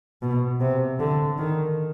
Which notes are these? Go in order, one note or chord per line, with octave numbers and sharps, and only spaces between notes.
B2
C3
D3
D#3